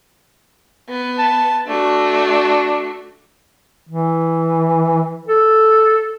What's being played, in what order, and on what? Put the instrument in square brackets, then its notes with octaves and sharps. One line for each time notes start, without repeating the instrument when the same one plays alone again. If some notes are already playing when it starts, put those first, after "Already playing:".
[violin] B3
[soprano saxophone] A5
[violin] A3 F#4 [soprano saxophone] D4
[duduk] E3
A4